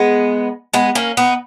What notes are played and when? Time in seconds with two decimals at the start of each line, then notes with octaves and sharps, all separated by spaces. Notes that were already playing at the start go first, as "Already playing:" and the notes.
Already playing: G#3 B3
0.73 G#3 B3
0.95 A#3 C#4
1.17 B3 D#4